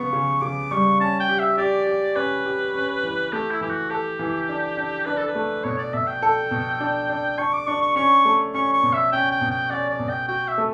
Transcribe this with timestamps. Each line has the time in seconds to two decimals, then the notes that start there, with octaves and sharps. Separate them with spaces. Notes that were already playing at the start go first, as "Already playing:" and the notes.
Already playing: C#3 B3 C#6
0.13 C#3
0.42 C#3 D6
0.71 G3 C#6
1.00 C#4 A5
1.20 G5
1.29 G4
1.39 E5
1.58 G4 D5
1.87 G4
2.16 C#4 B4
2.45 G4
2.74 C#4
3.03 E3
3.33 A3 G4
3.51 E4
3.61 E3 G4
3.70 F#4
3.90 G4 A4
4.19 E3
4.49 D4
4.77 D4
5.06 D4 B4
5.17 A4
5.27 B4
5.35 A3
5.64 B2 C#5
5.78 D5
5.93 B2 E5
6.07 G5
6.22 A4
6.51 B2
6.80 D4
7.09 D4
7.38 D4 C#6
7.53 D6
7.67 D4 C#6
7.82 C#6
7.96 C#4 C#6
8.25 A3
8.54 C#4 C#6
8.73 C#6
8.83 B2
8.93 E5
9.12 C#4 G5
9.32 G5
9.41 B2
9.51 G5
9.71 C#4 D5
9.90 D5
9.99 B2
10.09 G5
10.28 F#4 G5
10.48 E5
10.58 A3